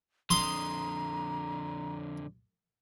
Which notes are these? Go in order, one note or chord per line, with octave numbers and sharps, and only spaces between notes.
F2 D3 A#5 C6 D#6